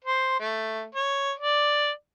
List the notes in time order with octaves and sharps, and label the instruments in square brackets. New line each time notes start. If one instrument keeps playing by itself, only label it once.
[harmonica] C5
A3
C#5
D5